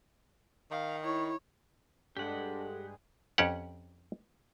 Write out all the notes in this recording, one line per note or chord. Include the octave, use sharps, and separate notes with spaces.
D#3 F5
E4 C#5
G2 G#3 D4 G4 A4 F#5
F2 C#4 G4 F#5